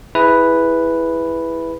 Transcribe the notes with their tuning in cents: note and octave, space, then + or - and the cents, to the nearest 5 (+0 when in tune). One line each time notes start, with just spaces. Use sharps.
E4 +0 G#4 -10 B4 +0